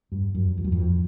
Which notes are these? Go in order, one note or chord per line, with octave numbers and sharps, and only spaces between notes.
G2
F#2
F2
F#2
F2